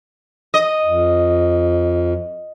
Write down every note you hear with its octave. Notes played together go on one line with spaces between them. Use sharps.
D#5
F2